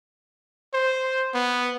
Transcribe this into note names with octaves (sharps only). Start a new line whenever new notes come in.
C5
B3